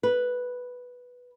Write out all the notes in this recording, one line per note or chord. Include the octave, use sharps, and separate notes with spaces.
B4